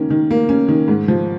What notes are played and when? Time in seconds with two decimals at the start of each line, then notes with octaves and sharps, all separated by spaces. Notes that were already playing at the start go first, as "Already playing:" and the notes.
Already playing: D#3 A#3 C#4
0.10 D#3
0.31 A#3
0.49 C#4
0.68 D#3
0.88 G#2
1.08 F3